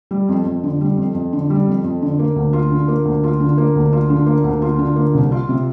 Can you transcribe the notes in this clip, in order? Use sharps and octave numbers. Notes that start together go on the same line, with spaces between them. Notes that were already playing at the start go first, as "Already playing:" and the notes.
G3
F2
F2
D3
G3
F2
F2
D3
G3
F2
F2
D3
A#3
D2
F4
D3
A#3
D2
F4
D3
A#3
D2
F4
D3
A#3
D2
F4
D3
A#3
C2
F4
C3